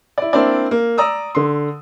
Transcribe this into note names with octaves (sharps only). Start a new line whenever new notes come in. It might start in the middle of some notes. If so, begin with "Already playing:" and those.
E4 D5
A#3 C4 D4 E4 D5
A#3
D5 A#5 D#6 E6
D3 C6